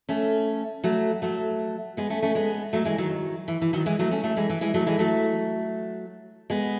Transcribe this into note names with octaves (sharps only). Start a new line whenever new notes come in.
A3 C#4
F#3 A3
F#3 A3
G#3 B3
A3 C#4
A3 C#4
G#3 B3
F#3 A3
E3 G#3
D#3 F#3
E3
E3
D#3 F#3
E3 G#3
F#3 A3
A3 C#4
F#3 A3
E3 G#3
E3
E3 G#3
F#3 A3
E3 G#3
F#3 A3
G#3 B3